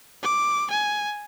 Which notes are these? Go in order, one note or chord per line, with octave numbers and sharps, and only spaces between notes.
D6
G#5